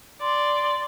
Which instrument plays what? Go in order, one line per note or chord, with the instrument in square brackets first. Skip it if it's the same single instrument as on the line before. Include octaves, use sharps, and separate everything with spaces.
[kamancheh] D5 [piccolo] C6